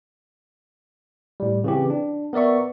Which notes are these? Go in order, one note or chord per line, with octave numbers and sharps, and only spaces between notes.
A2 G3
C#3 E3 C4 G4
D4
B3 A#4 D5 E5 C#6